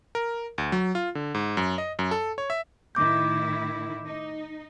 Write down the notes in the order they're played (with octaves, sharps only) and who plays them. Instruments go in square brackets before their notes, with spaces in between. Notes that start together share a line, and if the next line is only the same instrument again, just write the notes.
[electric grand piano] A#4
D2
F#3
F4
D3
G#2
F#2
D#5
F#2
A4
C#5
E5
[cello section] A2 D#3 E4 [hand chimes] D6 G6
[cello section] D#4